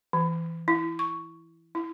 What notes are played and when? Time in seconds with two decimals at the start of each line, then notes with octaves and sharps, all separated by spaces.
0.13 E3
0.68 E4
0.99 C#6
1.75 E4